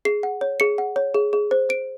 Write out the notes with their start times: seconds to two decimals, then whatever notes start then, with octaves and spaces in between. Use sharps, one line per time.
0.05 G#4 C7
0.23 F#5
0.41 C#5
0.60 G#4 C#7
0.78 F#5
0.96 C#5
1.14 G#4
1.33 G#4
1.51 C5
1.69 C5 D7